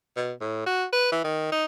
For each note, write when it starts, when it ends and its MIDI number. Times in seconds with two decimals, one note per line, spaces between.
0.17 0.33 47
0.41 0.66 45
0.66 0.85 66
0.92 1.11 71
1.12 1.21 52
1.24 1.50 51
1.52 1.65 63